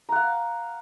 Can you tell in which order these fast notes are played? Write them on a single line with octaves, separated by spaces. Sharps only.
A#5 F#5 F5